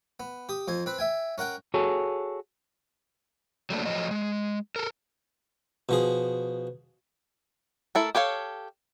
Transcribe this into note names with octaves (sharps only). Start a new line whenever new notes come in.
B3
G4 D#6
F2 C5 G#5
C4 B4
E5 G5 G#5
C#4 A#4 F#5 G5
F#4 G#4 A4 C#5
F#3 A3 A#3 D4
F3 F#3 A3 D#5
G#3
A4 A#4
B2 F3 G#4
A3 E4 A4 A#4
G4 A4 C#5 F5